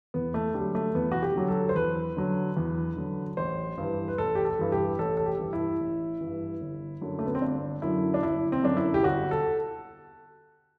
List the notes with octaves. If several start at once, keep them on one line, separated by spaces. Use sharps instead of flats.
E2 B3
A3
D3 G3
F#3
A3
E2 B3
F#4
G4
D3 F#3
A4
C5
E2 B4
D3 F#3
E2
D3 F#3
A1 C5
G2 E3
B4
A1 A4
G4
A4
G2 E3
G4
A1 A4
A4
G4
G2 E3
E4
A1
G2 E3
G1
F#2 D3 F#3
A3
B3
C4
G1 D4
F#2 D3 F#3 E4
D4
G1 E4
C4
F#2 D3 F#3 D4
E4
G4
G1 F#4
A4